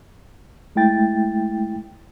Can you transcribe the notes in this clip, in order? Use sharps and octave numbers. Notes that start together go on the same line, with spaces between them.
G#3 A3 E4 G5 A6